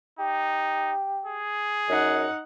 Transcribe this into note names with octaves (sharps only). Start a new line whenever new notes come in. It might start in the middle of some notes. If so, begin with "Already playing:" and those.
D#4 G4
G#4
F#2 D#4 F#5